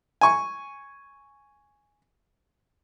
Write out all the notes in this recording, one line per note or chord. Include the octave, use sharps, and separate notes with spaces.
G#5 C#6